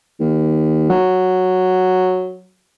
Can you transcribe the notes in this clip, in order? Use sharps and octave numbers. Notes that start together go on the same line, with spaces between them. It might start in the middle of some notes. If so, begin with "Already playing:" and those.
D#2
F#3